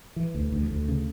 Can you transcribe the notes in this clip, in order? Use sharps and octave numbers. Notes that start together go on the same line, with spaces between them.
E3
D2
D2
D2
C#3